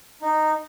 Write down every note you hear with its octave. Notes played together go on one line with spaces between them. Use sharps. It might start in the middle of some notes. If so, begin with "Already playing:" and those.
D#4